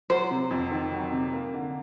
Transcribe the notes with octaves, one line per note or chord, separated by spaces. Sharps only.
F#3 C5
C3
F2
D#3
F#3
C3
A#3
D3